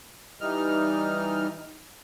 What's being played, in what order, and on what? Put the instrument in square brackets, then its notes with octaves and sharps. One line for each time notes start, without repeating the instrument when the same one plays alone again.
[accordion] E3 G3 D#4 F6